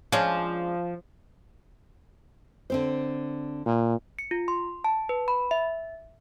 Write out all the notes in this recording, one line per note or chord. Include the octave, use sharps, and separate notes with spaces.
F3 G#3 C#4 D4
D3 C4 C5
A#2
C#7
F4
C6
A5
B4
B5
E5